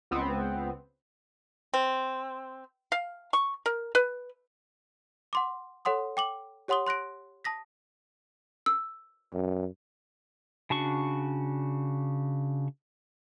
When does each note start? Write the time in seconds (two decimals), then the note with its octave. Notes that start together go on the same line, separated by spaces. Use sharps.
0.11 C#2 B3 C4
1.74 C4
2.92 F5
3.33 C#6
3.66 A#4
3.95 B4
5.33 F#5 C6 D6
5.85 A4 C#5 F#5 C6 D#6
6.17 G5 D6 F#7
6.68 G4 C#5 F#5 C6 D#6 G7
6.87 C6 F#6 A#6 D7
7.44 A5 D#6 A#6 B6
8.66 E6
9.33 F#2
10.70 C#3 D4 F#4 C#6